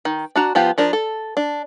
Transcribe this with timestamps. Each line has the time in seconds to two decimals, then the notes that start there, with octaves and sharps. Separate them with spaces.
0.05 D#3
0.36 D4 F#4 A#5
0.55 F3 B3 F4 G4
0.78 F3 D4 A#4
0.93 A4
1.37 D4